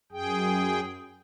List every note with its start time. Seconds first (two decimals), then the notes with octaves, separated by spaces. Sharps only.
0.12 F#2 G#4 G5